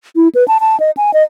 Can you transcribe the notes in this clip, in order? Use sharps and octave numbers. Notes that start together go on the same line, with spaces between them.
E4
B4
A5
A5
D#5
G#5
D#5